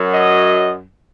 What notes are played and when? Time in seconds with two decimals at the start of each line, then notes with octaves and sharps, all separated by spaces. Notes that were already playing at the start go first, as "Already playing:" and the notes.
Already playing: F#2 F#3
0.12 D#5